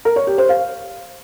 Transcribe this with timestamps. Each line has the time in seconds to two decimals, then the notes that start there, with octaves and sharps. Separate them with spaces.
0.05 A#4
0.16 C#5
0.27 G4
0.38 C5
0.49 F5